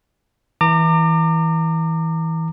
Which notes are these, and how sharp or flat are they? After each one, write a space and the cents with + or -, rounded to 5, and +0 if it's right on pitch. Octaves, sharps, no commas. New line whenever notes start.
E3 -25 A#5 -30 D6 +25